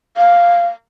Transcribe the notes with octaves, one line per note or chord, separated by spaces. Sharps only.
F5